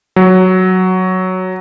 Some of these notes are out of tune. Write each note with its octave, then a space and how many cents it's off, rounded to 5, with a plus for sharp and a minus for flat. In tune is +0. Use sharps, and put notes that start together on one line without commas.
F#3 +5